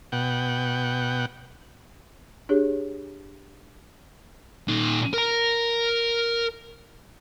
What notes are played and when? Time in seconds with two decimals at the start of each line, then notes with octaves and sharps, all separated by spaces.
0.12 B2 F#5 G5
2.49 D4 G4 G#4 C#5
4.68 A#2 D#4
5.13 A#4 A#5